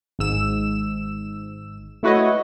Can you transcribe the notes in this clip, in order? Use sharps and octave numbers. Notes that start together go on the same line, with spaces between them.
G#1 G#2 E6 E7
A3 E4 F#4 B4 C#5 D#5